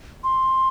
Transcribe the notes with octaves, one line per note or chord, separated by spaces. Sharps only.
C6